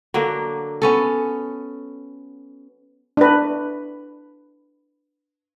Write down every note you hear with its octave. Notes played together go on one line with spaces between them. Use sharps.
D3 F#3 A#3
B3 C#4 A4
D4 B4